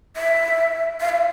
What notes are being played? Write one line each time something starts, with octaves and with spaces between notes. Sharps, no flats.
E5
F5
E5